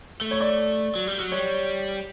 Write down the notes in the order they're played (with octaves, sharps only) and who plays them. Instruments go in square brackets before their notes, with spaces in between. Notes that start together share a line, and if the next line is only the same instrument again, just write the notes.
[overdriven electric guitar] A3
[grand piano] C#5
D5
[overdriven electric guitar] F#3
G3
F#3
[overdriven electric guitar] G3 [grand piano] C#5